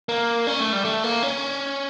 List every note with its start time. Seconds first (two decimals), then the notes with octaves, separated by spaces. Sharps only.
0.09 A#3
0.47 C#4
0.60 A3
0.73 G3
0.85 A3
1.04 A#3
1.23 C#4